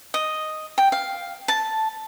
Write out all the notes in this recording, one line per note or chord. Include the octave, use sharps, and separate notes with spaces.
D#5
G5
F5
A5